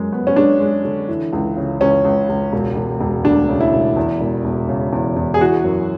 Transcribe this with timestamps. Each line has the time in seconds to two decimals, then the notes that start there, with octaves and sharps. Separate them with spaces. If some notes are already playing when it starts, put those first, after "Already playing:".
Already playing: F#2 G#3
0.13 B3
0.27 C#4
0.36 G#3 D4
0.60 G#3
0.85 D3
1.09 E3
1.33 C#2
1.57 C#3
1.80 C#2 C#4
2.05 C#2
2.29 C#2
2.53 E1
2.76 E1
3.01 E1
3.25 D2 D4
3.49 C#3
3.60 E4
3.73 E1
3.96 E2
4.20 E1
4.45 E1
4.69 C#3
4.92 E2
5.16 E2
5.34 G#4
5.40 E3 F#4
5.64 F#2